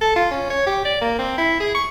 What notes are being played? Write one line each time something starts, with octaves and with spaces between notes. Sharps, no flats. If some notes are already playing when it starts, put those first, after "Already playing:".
A4
F4
C#4
C#5
G4
D5
A#3
C4
E4
G#4
C#6